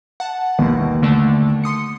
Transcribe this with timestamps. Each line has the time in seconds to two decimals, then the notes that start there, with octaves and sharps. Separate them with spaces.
0.20 F#5 A5
0.59 A1 D#2 B2
1.02 D3 A3 D4
1.64 C6 D#6 C#7